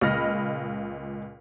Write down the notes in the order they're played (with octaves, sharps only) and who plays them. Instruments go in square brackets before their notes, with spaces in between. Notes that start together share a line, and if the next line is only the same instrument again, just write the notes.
[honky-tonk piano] C#2 A#2 D#5 B5 F6 A#6